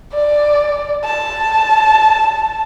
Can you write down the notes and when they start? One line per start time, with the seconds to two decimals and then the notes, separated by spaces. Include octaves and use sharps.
0.13 D5
1.04 A5